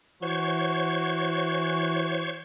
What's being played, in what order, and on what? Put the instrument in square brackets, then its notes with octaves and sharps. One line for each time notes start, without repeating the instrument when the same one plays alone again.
[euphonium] E3 [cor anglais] F#4 [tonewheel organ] C5 C#5 C#6